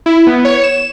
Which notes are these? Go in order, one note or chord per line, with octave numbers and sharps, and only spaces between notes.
E4
B3
C#5
E7